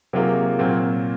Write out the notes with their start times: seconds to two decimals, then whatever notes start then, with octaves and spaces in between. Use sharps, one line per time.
0.13 C3 F#3 A#3 F4 G#4
0.59 A#2 F#3 C4 F4